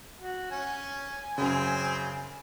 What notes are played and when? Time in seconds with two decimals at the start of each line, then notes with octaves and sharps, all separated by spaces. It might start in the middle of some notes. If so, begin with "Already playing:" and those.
0.19 F#4
0.51 C#4 G#5
1.38 F#2 C#3 C4